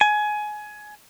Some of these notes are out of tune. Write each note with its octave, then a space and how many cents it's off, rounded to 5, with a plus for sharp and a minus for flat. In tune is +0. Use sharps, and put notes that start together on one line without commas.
G#5 +20